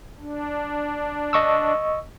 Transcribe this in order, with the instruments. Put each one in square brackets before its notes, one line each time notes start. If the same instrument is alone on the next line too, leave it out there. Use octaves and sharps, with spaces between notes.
[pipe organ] D4
[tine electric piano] D#5 C#6 E6